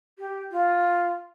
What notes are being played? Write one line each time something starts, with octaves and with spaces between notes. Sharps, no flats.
G4
F4